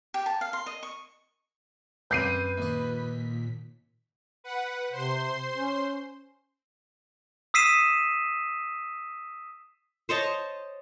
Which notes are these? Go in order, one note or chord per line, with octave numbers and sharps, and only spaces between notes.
G4
A5
F5
C6
D#5
C#6
F#2 C4 G4 B4 G6 C7 D#7
D#2 A#2 D#5 B6
B4 F#5
C3 C5 C6
C#4
D#6 E6 B6 C7 D#7 E7
C5 C#5 D#5 A5